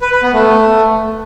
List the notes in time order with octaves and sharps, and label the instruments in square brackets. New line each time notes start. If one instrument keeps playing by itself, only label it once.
[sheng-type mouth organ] B4
B4
B3
A3